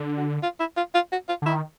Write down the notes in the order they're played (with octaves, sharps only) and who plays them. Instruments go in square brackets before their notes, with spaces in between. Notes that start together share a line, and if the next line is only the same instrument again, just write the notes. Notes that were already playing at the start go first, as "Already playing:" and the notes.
Already playing: [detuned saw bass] D3
[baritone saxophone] F#4
F4
E4
F4
F4
F#4
F4
[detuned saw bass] D3
[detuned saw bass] D#3 [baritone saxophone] E4